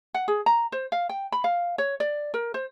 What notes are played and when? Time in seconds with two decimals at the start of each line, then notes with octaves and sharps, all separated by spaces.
0.14 F#5
0.28 G#4
0.46 A#5
0.72 C5
0.92 F5
1.09 G5
1.32 B5
1.44 F5
1.78 C#5
2.00 D5
2.34 A#4
2.54 C5